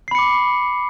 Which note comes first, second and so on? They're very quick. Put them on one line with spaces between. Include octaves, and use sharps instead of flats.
C7 B5 C#7 D6